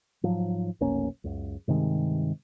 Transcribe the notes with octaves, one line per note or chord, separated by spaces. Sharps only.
G#2 F3 F#3
F1 B1 A#3 C#4
C#2 F#2
G2 C3 D#3 G#3